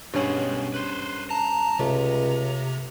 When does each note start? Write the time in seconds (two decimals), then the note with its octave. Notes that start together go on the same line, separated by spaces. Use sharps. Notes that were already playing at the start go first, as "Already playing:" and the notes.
0.14 G2 B2 C#4 G#4 F#5
0.74 B4 C5
1.30 A5 A#5
1.79 C#2 C3 A3